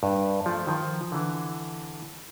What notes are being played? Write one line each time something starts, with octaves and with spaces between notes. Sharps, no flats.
G2
F3 A3
D#3 F3
D3 E3